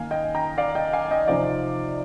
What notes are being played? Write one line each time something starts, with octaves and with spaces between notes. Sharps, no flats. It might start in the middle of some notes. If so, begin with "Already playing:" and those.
Already playing: D#3 A#3 D#4 F5 G#5
D#5 G5
G5 A#5
D5 F5
D#5 G5
F5 G#5
D#5 G5
C3 F3 C4 D#4 D5 F5